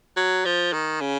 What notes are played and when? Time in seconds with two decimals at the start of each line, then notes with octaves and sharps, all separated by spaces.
0.17 F#3
0.45 F3
0.73 D#3
1.01 C#3